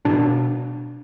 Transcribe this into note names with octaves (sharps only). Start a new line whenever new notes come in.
B2 D4